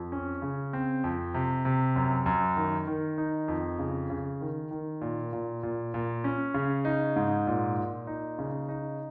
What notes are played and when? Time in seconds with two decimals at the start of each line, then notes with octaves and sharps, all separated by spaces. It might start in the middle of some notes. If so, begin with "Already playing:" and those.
Already playing: F2
0.12 C#4
0.42 C#3
0.73 C4
1.04 F2
1.34 C3
1.65 C3
1.96 F#2
2.26 F#2
2.57 D#3
2.87 D#3
3.18 D#4
3.48 F2
3.79 C#3
4.10 C#3
4.41 D#3
4.71 D#3
5.01 A#2
5.33 A#2
5.63 A#2
5.94 A#2
6.24 C#4
6.54 C#3
6.85 D#4
7.16 G#2
7.47 A#2
7.77 A#2
8.07 D#4
8.39 C#3
8.69 D#4